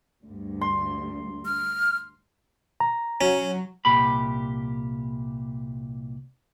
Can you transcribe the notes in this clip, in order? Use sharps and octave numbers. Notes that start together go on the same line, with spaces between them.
D2 G2
C6
F6
A#5
F#3 C#4
C2 A#2 G4 B5